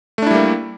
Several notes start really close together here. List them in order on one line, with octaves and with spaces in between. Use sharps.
A3 D4 E4 G3 A#3